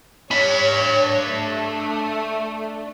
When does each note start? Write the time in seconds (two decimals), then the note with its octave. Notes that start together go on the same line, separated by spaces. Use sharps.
0.31 D4 C#5 B5
1.26 A3